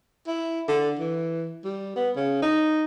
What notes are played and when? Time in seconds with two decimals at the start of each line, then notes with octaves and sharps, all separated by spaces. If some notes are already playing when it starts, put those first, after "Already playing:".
0.27 E4
0.68 D3
0.99 E3
1.64 G3
1.96 B3
2.16 C#3
2.42 D#4